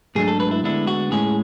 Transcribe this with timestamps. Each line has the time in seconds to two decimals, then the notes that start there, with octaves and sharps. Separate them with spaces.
0.15 G#2 F#3 A3 D4 G#4
0.28 A4
0.40 B4
0.51 E4
0.63 D2 D3 G#3 B3 D4 E4
0.87 F#4
1.11 A2 G#3 C#4 G#4